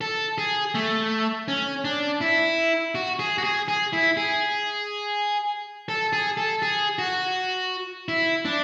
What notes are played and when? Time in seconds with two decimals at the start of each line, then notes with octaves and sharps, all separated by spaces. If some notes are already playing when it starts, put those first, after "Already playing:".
0.01 A4
0.38 G#4
0.75 A3
1.48 C#4
1.85 D4
2.21 E4
2.95 F#4
3.19 G#4
3.38 F#4
3.44 G#4
3.68 G#4
3.93 E4
4.17 G#4
5.89 A4
6.13 G#4
6.37 A4
6.62 G#4
6.99 F#4
8.08 E4
8.45 D4